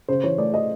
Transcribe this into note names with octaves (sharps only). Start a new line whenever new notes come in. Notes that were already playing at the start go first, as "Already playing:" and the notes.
C#3 C5
E3 C#5
A3 D5
D#5